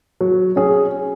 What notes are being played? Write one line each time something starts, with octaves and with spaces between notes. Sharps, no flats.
F#3
C#4 G#4